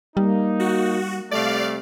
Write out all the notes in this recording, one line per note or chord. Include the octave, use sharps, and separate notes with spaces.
G3 A#3 D#4
F#4
C3 G3 A3 D5 F5